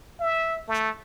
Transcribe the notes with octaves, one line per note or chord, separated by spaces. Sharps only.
E5
A3